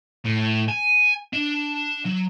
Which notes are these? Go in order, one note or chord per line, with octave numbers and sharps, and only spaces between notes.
A2
G#5
D4
F#3